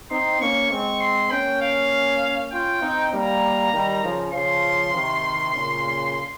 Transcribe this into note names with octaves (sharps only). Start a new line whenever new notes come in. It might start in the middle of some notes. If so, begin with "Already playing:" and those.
C4 D#4 C6
A#3 C#4 C#6
G#3 C4 C#6
C6
A#3 C#4 G5
F5
C#4 F4 G5
C4 D#4
G3 A#3 A#5
D#3 G3
C#3 F3
C#3 F3 C6
C3 D#3
A#2 C#3